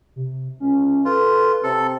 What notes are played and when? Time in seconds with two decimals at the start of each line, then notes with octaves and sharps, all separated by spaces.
0.16 C3
0.60 C#2 C#4
1.05 F4 A4 B4
1.64 C3 A4